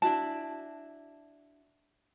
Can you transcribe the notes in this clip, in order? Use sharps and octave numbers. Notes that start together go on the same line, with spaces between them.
D4 E4 F#4 A5